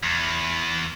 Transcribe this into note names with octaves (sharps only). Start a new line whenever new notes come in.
E2